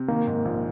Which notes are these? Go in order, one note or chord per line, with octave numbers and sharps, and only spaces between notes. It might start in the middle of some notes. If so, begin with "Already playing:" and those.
Already playing: C3
D#3 A#3
G#2
A#1